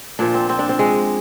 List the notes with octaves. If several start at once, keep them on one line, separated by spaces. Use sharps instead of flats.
A#2 F3 D4
C4
C4
D4
C4
G#3